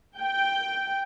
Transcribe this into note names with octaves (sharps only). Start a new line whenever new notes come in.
G5